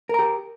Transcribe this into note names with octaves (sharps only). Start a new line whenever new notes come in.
G4 A#4 A#5